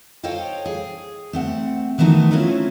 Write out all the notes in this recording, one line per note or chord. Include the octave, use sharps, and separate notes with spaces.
A4 C5 C#5 D#5 F5 G5
G#4
A3 C4 F#5
D#3 E3 F#3 A3 B3 D#4
F#3 A3 C4 C#4 E4 F4